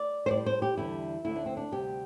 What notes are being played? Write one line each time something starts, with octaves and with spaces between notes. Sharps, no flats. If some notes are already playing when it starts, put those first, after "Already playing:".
Already playing: D5
C5
A2 G3 D5
C5
G4
E2 D3 G3 E4
D2 D3 A3 E4
D4
C4
D4
D2 C3 G3 G4